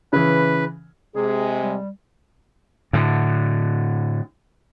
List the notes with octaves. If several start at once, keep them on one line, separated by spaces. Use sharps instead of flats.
C#3 E3 B4
C3 G#3 G#4
G3
A2 D3